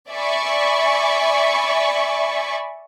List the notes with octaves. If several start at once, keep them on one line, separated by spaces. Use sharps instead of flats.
D5 E5 G#5 B5 C#6